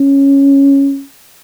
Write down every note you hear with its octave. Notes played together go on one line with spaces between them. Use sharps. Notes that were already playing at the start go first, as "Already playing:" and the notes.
Already playing: C#4